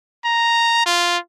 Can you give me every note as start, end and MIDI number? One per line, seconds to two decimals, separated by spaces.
0.25 0.85 82
0.86 1.18 65